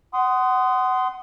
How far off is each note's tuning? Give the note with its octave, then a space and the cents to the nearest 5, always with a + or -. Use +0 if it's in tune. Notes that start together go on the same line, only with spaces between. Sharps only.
F#5 +20 C6 -20 D#6 +0